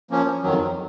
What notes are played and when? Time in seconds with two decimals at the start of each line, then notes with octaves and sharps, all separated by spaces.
0.10 F3 A#3 C#4
0.43 F2 D#3 F#3